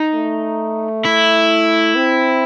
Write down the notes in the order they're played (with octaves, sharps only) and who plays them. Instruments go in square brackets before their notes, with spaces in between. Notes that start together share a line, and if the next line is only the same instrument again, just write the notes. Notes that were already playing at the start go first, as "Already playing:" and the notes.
Already playing: [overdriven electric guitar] D#4
[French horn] A3
[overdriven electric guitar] E4
[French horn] C4